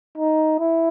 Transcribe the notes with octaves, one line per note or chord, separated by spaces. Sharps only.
D#4
E4